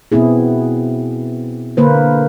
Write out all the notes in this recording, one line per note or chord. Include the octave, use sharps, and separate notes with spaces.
B2 B3 C4 E4 G#4
D3 A#3 B4 C5